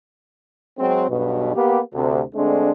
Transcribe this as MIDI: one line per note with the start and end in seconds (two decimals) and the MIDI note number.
0.79 1.05 54
0.79 1.05 56
0.79 1.05 60
1.10 1.55 35
1.10 1.55 43
1.10 1.55 47
1.55 1.80 58
1.55 1.80 59
1.55 1.80 67
1.94 2.22 38
1.94 2.22 48
2.35 2.71 50
2.35 2.71 56
2.35 2.71 57
2.35 2.71 60
2.35 2.71 62